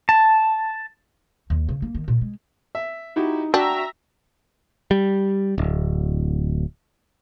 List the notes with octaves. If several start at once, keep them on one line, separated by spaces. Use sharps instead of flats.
A5
D#2
C#3
A#3
D#3
A#2
G#3
E5
D#4 E4 F#4 G4
D4 F#4 E5 G5 A#5
G3
D1